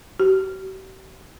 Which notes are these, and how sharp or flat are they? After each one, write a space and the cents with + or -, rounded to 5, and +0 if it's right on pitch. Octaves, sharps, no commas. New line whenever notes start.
G4 -45